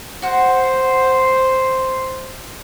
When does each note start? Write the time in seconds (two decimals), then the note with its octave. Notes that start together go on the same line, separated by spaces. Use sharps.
0.22 F#4 C5 F#5